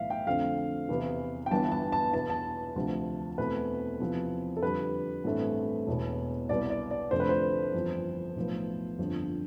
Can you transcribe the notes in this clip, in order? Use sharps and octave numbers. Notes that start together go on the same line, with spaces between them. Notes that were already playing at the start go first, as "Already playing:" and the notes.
Already playing: B1 A2 E3 E5 F5
G5
F2 D3 A3 C4 F5
E2 C3 E3 B3
G5
G1 G2 E3 B3 A5
A5
A5
E2 B2 B3 A5
A5
D2 C3 F3
E2 B2 A3 C4 B4
E2 C3 F3 C4
A4
F2 D3 G3 B4
A1 G2 E3 A3 C4
E1 E2 B2
C2 B2 B3 D5
D5
D5
F1 F2 D3 A3 C5
B4
C5
G1 F2 E3
B1 A2 F3 B3
G1 F2 D3